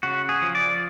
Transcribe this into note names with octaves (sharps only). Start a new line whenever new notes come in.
C#3 F#4
G#4
F3
D5